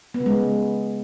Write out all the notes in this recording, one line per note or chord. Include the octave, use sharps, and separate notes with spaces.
B3
C#3
G#3